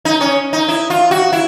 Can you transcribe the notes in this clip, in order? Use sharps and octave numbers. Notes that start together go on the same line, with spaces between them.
D#4
C#4
D#4
E4
F4
F#4
E4